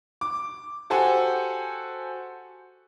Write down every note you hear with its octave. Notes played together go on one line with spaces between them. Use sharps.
D6
F#4 G4 A4 C5 F#5 G#5